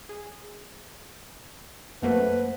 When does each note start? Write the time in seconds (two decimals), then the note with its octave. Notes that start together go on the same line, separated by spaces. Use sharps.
0.09 G#4
2.02 F#2 A3 A#3 B4 C5 F#5 A5